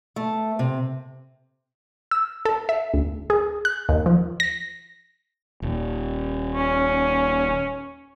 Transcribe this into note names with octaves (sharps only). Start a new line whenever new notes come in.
A3
C3
E6
A4
E5
D2
G#4
F#6
D#2
F3
A#6
D#1
C#4